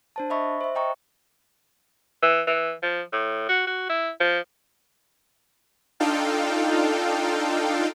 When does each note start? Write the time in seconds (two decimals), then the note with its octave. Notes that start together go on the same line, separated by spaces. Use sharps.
0.16 D4 C5 A5
0.30 D#5 E5 B5 C#6
0.61 C5 E5
0.75 D#5 G5 A#5 C#6
2.22 E3
2.47 E3
2.83 F3
3.12 A2
3.49 F#4
3.67 F#4
3.89 E4
4.20 F3
6.00 D4 D#4 F4 A4 F5 G5